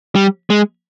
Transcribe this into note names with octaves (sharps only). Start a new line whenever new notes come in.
G3
G#3